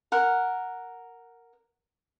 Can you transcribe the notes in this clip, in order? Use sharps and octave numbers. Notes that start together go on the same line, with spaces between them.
A#4 F#5